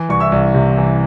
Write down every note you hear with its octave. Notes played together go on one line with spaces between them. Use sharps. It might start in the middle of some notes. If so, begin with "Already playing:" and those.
Already playing: E3
C2 C#6
E5 E6
C2
C3
E3